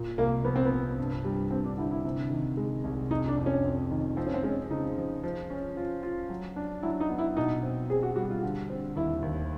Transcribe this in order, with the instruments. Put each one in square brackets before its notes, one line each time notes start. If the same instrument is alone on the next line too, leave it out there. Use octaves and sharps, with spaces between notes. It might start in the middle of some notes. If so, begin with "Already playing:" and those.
Already playing: [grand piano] A#2
[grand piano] C2 [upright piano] A#3
[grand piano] F3 [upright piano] B3
[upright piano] C4
B3
[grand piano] C2
G2
G3
[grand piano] G2 [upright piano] C4
[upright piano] D4
[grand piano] D3 [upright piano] E4
[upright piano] E4
[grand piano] C3
D#3
G#3
C2
[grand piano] F2 [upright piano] D#4
[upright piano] D4
[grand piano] F2
[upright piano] C#4
[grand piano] F2
D#3
[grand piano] F3 [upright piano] C4
[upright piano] C#4
C4
[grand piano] G#3 [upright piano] C#4
[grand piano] C#3 [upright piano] D#4
[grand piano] F3
F3
C#4
F4
F4
F#3
D4
[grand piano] F#3 [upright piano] E4
[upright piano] D#4
[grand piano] B3
[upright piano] E4
[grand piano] B2 [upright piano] D#4
[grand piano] C4
[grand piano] C4 [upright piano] G#4
[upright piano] F#4
[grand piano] G3 [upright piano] F#4
[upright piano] F4
[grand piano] D3
C4
[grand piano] D#2 [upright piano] E4
[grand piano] D#2